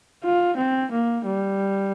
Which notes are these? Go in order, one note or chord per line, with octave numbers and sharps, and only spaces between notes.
F4
C4
A#3
G3